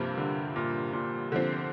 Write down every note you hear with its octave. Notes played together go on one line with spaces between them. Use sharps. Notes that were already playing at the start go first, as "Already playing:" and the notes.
Already playing: G2 C3 F3 A#3
D3
A#2
A#2
D3 F3 C4